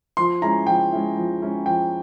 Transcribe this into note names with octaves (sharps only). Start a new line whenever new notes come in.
F3 C6
G#3 C#4 E4 A#5
F3 G5
G#3 C#4 E4
F3
G#3 C#4 E4
F3 G5